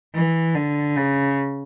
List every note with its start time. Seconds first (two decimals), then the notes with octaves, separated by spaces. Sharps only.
0.14 E3
0.55 D3
0.96 C#3